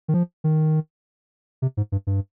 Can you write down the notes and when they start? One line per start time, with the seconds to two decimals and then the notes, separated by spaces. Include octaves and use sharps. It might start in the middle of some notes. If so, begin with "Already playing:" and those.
0.08 D#3
0.14 F3
0.44 D#3
1.62 C3
1.77 G#2
1.92 G2
2.07 G2